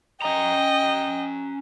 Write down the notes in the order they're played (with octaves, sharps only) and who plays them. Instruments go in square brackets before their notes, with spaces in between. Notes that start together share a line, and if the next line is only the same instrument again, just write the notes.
[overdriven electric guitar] C#4 A#5 [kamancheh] D#5 G5